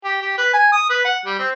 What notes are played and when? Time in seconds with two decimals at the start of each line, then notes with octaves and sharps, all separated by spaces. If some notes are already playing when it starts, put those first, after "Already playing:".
0.04 G4
0.22 G4
0.38 B4
0.54 G#5
0.72 D#6
0.90 B4
1.05 F#5
1.26 G3
1.39 C4